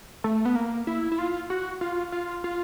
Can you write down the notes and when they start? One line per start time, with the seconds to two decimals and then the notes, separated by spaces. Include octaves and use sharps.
0.24 A3
0.45 B3
0.55 A#3
0.87 E4
1.12 E4
1.19 F4
1.50 F#4
1.81 F4
2.12 F4
2.44 F4